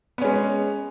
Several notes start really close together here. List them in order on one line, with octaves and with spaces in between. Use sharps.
B3 C#4 G#3